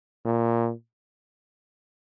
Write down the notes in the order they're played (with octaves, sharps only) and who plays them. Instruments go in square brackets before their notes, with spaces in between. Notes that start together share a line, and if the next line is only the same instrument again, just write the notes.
[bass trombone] A#2